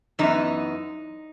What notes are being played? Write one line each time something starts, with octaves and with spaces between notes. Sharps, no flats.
F#2 E3 B3 D#4